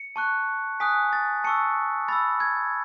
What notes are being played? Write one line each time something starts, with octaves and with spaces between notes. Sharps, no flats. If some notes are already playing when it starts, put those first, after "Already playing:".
Already playing: C#7
A5 C#6 F#6
G#5 D#6 F#6 B6
A6
A5 C#6 E6 C#7
B5 E6 A6
G#6